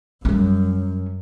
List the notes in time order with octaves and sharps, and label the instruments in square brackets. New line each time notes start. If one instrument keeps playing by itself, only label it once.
[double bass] F#2 [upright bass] G3 C#4